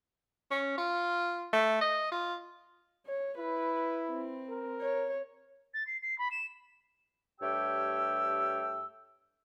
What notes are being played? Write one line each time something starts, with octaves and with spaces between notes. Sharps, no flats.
C#4
F4
A3
D#5
F4
C#5
E4 B4
C4
A#4
C#5
A6
C7
C7
B5
E7
G2 A3 G4 C#5 G5 E6